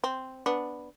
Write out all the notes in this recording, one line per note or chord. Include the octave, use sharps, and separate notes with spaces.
C4
B3 D4